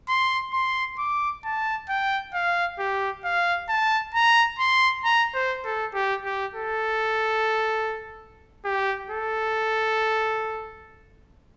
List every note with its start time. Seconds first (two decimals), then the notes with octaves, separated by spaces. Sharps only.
0.09 C6
0.53 C6
0.98 D6
1.44 A5
1.89 G5
2.34 F5
2.79 G4
3.24 F5
3.69 A5
4.14 A#5
4.59 C6
5.04 A#5
5.34 C5
5.65 A4
5.94 G4
6.25 G4
6.55 A4
8.65 G4
9.10 A4